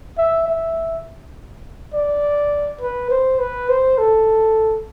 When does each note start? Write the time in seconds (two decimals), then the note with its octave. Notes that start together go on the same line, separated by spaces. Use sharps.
0.18 E5
0.48 E5
1.94 D5
2.81 B4
3.10 C5
3.39 B4
3.69 C5
3.98 A4